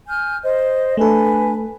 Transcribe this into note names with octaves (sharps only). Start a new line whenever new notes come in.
G#5 F6 G6
C5 D#5
A3 D4 A4 B4 G#5